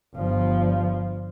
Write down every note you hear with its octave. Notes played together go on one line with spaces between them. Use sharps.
G1 F3